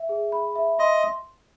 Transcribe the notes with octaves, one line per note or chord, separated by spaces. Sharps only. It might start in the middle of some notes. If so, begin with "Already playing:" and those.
Already playing: E5
G#4
B5
E5
D#5 C6